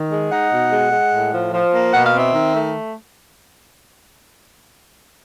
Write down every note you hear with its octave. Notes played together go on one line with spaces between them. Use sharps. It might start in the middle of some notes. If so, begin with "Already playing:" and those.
Already playing: D#3
G#3
D#4 F#5
B2
G#3
G#3
A2
F3
F3
A#3
B2 F#5
F5
C4
E5
D#3
A3